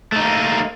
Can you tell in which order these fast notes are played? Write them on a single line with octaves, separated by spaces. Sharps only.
A3 D#4 A#3